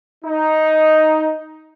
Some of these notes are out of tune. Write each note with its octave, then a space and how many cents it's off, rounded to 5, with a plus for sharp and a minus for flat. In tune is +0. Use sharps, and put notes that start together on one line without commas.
D#4 +5